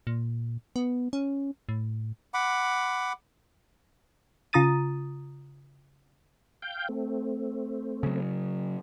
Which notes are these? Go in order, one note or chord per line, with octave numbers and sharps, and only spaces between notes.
A#2
B3
C#4
A2
F#5 B5 D6
C#3 F4 A#5 D#6 A6 D#7
F5 G5 G6
A3 C4
C#3 F#3